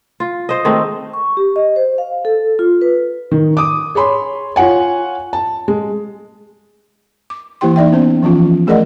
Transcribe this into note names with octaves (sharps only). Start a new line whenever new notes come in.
F4
C5 D#5
D#3 G#3 A3 C4
C#6
G4
D#5
C5
F5
A4
F4
B4
D#3
D6 D#6
G#4 C#5 B5 C6
F4 C#5 F#5 G#5
A5
G#3
D6
E3 A#3 E4 G4 G5 C6
D#4 D5 E5 G5
B3 C#4 C5
E3 F3 C#4 F4
A3 G#4 A#4 D5 D#5 F#5